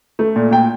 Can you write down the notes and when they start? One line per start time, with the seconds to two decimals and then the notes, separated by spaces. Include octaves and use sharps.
0.19 A3
0.36 A#2
0.51 A#2 G5